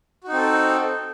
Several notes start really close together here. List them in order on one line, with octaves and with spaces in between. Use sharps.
F#4 D#4 C4 A4